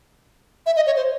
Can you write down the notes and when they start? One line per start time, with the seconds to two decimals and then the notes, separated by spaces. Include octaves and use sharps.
0.66 E5
0.76 D#5
0.87 C#5
0.96 C5